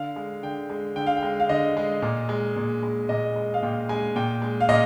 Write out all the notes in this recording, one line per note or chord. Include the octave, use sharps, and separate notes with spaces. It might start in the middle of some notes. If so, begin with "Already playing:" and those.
Already playing: D3 F5
G#3
D3 G5
G#3
D3 G5
F5
G5
G#3
F5
D3 D#5
G#3
A#2
G#3
A#2
G#3
A#2 D#5
G#3
F5
A#2 G5
G#3 G#5
A#2 G5
G#3
F5
A#2 D#5